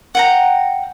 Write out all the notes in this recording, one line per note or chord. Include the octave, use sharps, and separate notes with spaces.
F#5 G5 A#5